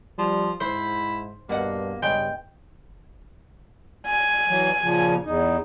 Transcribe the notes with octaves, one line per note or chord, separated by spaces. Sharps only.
F3 G3
G#2 E4 C5
G2 B2 A#3 F#5
G2 C#3 G#3 G5 G6
G#5
E3 F#3
A#2 C#3 F3
E2 D#4